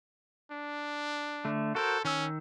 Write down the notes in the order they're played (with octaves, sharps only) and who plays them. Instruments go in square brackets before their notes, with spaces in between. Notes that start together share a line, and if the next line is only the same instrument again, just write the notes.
[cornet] D4
[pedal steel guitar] D3 A3
[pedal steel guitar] F#4 A#4 C5 [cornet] A4
[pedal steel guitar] D#3 E6 [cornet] C#4